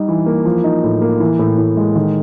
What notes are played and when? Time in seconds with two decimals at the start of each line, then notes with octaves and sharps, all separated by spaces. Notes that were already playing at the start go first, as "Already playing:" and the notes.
Already playing: G3 D#4
0.08 E3
0.26 A#3
0.45 F3
0.64 D#4
0.84 A2
1.02 A#3
1.20 E3
1.39 A2
1.58 A2
1.77 G#3
1.96 D#3